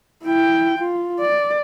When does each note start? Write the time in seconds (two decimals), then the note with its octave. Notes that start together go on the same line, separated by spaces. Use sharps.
0.24 E4 G5
0.79 F4
1.20 D5